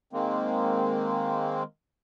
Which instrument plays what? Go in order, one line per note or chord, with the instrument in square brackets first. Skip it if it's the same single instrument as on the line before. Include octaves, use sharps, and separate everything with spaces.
[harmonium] D#3 G#3 A#3 C4